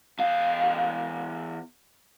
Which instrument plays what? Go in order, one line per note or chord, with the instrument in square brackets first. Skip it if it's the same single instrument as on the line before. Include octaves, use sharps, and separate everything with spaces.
[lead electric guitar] E2 F5